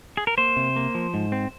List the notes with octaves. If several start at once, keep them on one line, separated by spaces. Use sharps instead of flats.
G#4
A#4
A#3 C5
C3
A#3
F3
G#2
C4